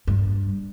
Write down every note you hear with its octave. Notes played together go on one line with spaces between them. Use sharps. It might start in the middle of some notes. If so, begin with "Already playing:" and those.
G2